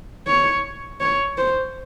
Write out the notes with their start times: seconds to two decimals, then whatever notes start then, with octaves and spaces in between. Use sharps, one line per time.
0.27 C#5
1.00 C#5
1.37 C5